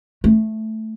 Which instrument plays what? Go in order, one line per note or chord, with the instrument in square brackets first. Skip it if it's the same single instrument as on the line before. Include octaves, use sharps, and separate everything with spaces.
[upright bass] A3